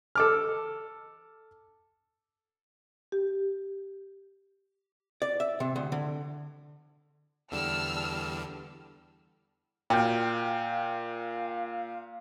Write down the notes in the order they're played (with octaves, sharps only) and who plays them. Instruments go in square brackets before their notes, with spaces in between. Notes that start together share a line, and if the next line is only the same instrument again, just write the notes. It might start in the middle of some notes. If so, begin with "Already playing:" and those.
[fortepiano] A4 D6 F6
[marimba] G4
[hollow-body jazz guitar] D5
E5
C3
D2
D3
[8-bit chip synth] E2 D3 G3 [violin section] A5 E6 F6
[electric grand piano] A#2 [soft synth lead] F5 [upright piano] G5 F6 G6